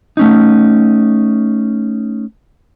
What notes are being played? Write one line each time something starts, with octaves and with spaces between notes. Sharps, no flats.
A3 C#4 D#4